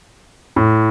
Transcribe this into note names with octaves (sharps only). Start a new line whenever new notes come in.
A2